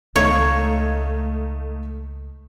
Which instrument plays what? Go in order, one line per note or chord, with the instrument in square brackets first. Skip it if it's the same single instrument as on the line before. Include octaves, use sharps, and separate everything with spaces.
[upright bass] C#2 D#3 [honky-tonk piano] A3 D#4 F5 [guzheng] C#5